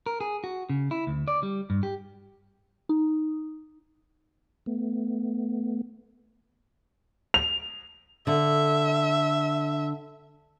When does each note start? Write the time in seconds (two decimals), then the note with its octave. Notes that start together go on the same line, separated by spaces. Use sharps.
0.06 A#4
0.21 G#4
0.44 F#4
0.70 C#3
0.91 E4
1.07 D2
1.28 D5
1.43 G3
1.70 G2
1.83 G4
2.89 D#4
4.66 A3 B3
7.34 F7
8.27 D3 E5